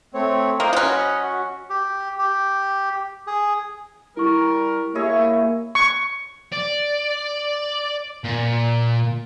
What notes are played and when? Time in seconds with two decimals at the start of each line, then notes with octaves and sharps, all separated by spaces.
0.14 A3 C4 C#5
0.60 A#3 C5 D#5
0.73 F#3 C#4
0.91 D#5 F#5 B5
1.22 F#4
1.70 G4
2.18 G4
3.27 G#4
4.17 G3 E4 A#4 C#6
4.95 A#3 E4 G4 G#4 C#5 D#5
5.75 C#6
6.53 D5
8.24 A#2